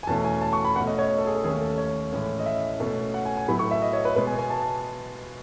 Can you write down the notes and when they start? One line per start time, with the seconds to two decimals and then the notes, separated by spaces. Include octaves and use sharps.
0.03 G#5
0.07 E2 B2 A3 C#4 A5
0.25 G#5
0.41 A5
0.53 C#6
0.65 B5
0.76 B2 A3 C#4 F#5
0.87 D#5
0.99 C#5
1.18 A4
1.27 G#4
1.35 A4
1.44 D#2 D#3 A3 C#4 G#4
1.61 A4
1.78 C#5
2.12 A2 E3 G#3 C#4
2.39 D#5
2.46 E5
2.80 B2 A3 C#4
3.14 F#5
3.25 G#5
3.37 G#5
3.48 A2 F#3 B3 B5
3.59 C#6
3.71 E5
3.82 D#5
3.93 C#5
4.05 B4
4.16 B2 G#3 B3 B4
4.27 G#5
4.39 G#5
4.50 A5
4.62 A5